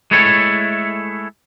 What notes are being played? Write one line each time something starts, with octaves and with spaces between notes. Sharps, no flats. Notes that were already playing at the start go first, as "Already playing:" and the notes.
G#3 A3 E4 A4 C#5